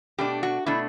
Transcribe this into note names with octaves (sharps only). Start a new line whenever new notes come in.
B2 A3 D4 G4
F#4
B2 A3 D4 E4